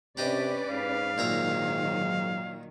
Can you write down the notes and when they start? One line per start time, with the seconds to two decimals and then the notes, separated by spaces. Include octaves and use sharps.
0.17 C3 C#4 D4 G4 B4 D5 D#5
0.71 G#2 F5
1.18 A#2 D#3 F#3 E5 A#5